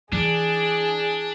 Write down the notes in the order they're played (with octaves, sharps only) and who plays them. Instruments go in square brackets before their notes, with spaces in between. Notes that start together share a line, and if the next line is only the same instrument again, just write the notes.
[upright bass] E3 [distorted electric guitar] D4 [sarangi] G#4